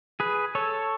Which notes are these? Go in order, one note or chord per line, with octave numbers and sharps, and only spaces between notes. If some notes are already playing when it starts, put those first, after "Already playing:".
G#4 B4
A4 C#5